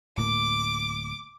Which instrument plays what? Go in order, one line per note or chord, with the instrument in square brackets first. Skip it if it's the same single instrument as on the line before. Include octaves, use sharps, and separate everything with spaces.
[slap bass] D1 A2 A#3 [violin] D6